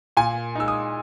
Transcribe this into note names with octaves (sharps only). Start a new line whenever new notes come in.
A#2 G#5
G#3 D#4 E6
D#6